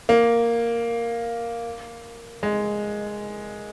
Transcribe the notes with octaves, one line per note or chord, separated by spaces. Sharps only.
A#3
G#3